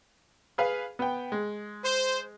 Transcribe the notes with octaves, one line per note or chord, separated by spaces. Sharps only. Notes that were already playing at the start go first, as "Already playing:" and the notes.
G#4 B4 F5
B3 G5
G#3
C5